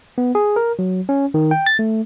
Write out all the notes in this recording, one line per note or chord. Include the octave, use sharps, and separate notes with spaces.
B3
G#4
A#4
F#3
C#4
D#3
G5
A6
A3